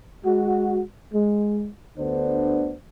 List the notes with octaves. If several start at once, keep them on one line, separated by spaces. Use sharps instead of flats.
G#3 F#4
G#3
D2 D3 B3 D4 C5